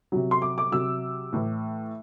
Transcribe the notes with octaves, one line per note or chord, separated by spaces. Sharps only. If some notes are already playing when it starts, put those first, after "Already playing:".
C3 F#3
C6
D6
D6
C3 F#3 E6
A2 E3